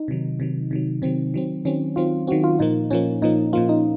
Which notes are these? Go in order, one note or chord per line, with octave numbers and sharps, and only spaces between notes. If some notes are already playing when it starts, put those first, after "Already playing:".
Already playing: D#4
C3 D#3 F#3
C3 D#3 F#3
C3 D#3 F#3
C3 D#3 F#3 C4
D#3 F#3 C4
D#3 F#3 C4 C#4
D#3 F#3 C4 F4
D#3 F#3 C4 F#4
F4
A#2 F3 A#3 D#4
A#2 F3 A#3 C#4
A#2 F3 A#3 D#4
A#2 F3 A#3 F4
D#4